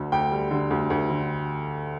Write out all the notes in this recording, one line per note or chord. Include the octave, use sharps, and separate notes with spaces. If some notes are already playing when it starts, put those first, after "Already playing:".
Already playing: D2 D3
D2 G5
G3
D3
D2
D2
D3